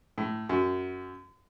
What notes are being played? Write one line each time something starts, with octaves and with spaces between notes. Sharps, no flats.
A2
F#2